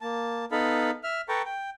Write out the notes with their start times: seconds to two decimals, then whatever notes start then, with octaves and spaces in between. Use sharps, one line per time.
0.01 A#3 A5
0.52 B3 D#4 A4 F5 B5
1.04 E5 F6
1.29 A4 B4 G5 A5 A#5 C#6
1.45 G5